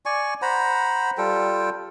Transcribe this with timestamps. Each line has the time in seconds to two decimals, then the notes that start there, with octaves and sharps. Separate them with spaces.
0.06 D5 G#5 C#6
0.42 C5 F#5 A#5 B5
1.18 G3 F4 A4 G5